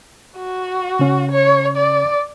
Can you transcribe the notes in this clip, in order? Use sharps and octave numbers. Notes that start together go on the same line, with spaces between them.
F#4
C#3 C#4
C#5
D5